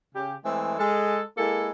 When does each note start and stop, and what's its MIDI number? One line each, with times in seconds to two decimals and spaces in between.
0.15 0.34 49
0.15 0.34 67
0.44 0.77 52
0.44 0.77 56
0.44 0.77 57
0.44 0.77 60
0.78 1.20 56
0.78 1.20 69
1.36 1.70 56
1.36 1.70 58
1.36 1.70 64
1.36 1.70 69